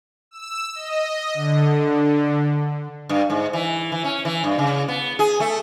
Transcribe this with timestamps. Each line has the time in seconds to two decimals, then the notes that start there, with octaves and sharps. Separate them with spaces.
0.31 E6
0.75 D#5
1.34 D3
3.09 G2
3.30 G#2
3.53 E3
3.92 E3
4.04 C#4
4.25 E3
4.44 G2
4.59 C#3
4.88 B3
5.19 G#4
5.40 A3